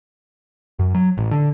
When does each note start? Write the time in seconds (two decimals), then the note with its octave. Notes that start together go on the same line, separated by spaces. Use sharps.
0.79 F#2
0.94 F#3
1.17 A1
1.31 D3